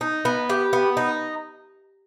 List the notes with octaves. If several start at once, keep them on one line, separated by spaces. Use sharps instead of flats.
D#4
B3
G4
B3
D#4